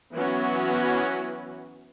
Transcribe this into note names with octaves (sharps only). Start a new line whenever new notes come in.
E3 F#3 B3 C#4 F#4